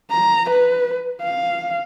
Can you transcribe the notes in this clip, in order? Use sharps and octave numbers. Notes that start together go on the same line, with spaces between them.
A#5
B4
F5